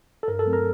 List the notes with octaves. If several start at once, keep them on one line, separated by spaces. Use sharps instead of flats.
A4
G2 A#4
A4
F#3 A3 C4
A#4